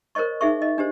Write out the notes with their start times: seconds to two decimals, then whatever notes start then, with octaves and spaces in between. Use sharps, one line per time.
0.15 A#4 C5 C#5 D#5 C#6
0.41 D#4 G#4 E5 C#6
0.62 D#5
0.78 D4 G4 C5